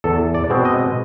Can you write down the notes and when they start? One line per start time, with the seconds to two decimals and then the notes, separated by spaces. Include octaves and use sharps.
0.04 E2 A4
0.34 D5
0.50 B2 G#3 C4
0.65 D#5